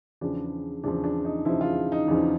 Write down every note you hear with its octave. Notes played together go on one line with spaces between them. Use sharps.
E2 C#3 F3 D4
E2 C#3 F3 D4
D4
D#4
E2 C#3 F3 E4
F4
D#4
E2 C#3 F3 D4